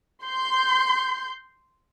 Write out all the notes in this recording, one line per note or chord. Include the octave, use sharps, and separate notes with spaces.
C6 G6